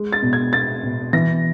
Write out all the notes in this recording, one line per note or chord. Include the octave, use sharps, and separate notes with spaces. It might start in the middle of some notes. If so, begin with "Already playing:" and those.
Already playing: G#3
A6
B2
G#6
B3 A6
B2
E3 A#6